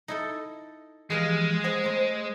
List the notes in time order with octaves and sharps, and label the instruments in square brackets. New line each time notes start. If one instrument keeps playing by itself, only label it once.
[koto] D#4 E4 A4
[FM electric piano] E3 F3 G4 [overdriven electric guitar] G#3 [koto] G#4 B4 F5
[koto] B3 G#4 G#5 [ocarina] C5
[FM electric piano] A3 [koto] C4 A#5